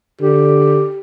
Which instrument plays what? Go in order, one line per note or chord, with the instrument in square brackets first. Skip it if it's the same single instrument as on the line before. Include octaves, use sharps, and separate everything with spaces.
[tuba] D3 [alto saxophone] G4